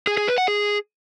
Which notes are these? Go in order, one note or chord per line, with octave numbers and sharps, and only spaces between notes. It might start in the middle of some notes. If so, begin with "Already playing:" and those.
G#4
G#4
B4
F#5
G#4